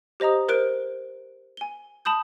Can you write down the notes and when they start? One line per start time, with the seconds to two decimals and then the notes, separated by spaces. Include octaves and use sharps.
0.20 G4 C5 D#5 A#5 D#6
0.49 A#4 C5 F#6 D7
1.57 G#5 G7
2.05 A5 B5 D#6 G6